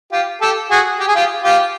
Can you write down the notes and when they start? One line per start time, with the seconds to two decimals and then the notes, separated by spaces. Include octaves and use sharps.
0.12 F4 G4
0.41 G4 A4
0.70 F#4 G#4
1.00 G4
1.08 G#4
1.15 F4 G4
1.44 F4 G4